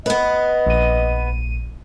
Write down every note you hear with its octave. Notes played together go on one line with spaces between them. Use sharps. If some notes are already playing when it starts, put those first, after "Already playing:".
B3 B4 D#5
A#1 D#7